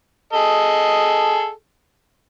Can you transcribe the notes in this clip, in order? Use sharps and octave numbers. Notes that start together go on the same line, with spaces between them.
G#4 A4 D#5